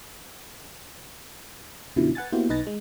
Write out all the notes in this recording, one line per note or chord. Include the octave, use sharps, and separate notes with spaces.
F#2 B2 D3 F3 F#3 E4
B4 F#5 G#5 A6
A#3 B3 E4 F#4 G4 C5
B1 D#4 B4 G#5 A6 A#6
G#3